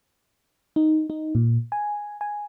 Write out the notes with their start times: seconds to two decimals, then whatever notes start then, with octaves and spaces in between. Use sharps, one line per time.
0.76 D#4
1.10 D#4
1.35 A#2
1.72 G#5
2.21 G#5